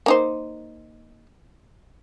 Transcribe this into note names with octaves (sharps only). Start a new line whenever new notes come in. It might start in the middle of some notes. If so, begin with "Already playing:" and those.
A#3 D#4 C5